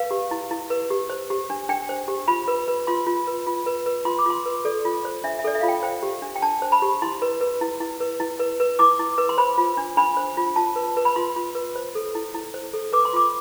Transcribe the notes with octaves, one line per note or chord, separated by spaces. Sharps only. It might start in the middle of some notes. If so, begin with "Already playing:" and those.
Already playing: B4 F5
G4
E4
E4
B4
G4
C5
G4
D4
D4 G5
C5
G4
F4 B5
B4
B4
F4 C6
F4
B4
F4
B4
B4
F4 C6
D6
F4 C6
B4
A4 D5
F4
C5
D4 E5
E5
A4 D5
E5
F4 F5
G5
C5 G5
G4
D4
G5
D4 A5
C5
B5
G4
E4 C6
B4
B4
E4
E4
B4
E4
B4
B4
E4 D6
E4
B4
C6
C5 B5
F4
D4
D4 B5
C5
F4
F4 A5
B4
B4
B5
F4 C6
F4
B4
C5
A4
E4
E4
C5
A4
B4 D6
C6
F4 D6